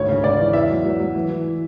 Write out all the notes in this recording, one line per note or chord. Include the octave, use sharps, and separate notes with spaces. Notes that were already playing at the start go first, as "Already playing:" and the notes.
Already playing: G#1 D2 C#5
C#3
C#3 D5
E3
E2 E5
F#3
F#3
F#3
E3
E3